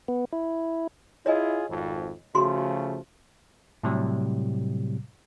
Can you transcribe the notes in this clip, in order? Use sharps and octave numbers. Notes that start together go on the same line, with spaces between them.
B3
E4
E4 F4 G#4 C#5 D#5 G#5
G#1 F2
C#3 F3 A3 F#4 G#4 C6
A2 C3 F#3 G3